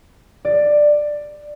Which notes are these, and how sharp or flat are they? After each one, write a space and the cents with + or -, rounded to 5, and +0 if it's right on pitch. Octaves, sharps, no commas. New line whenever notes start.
D5 +10